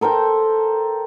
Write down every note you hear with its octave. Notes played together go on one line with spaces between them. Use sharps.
A4 A#4 C5 G5